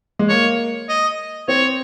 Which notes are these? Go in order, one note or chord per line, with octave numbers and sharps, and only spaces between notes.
G#3
A#3 C#5
D#5
C4 C#5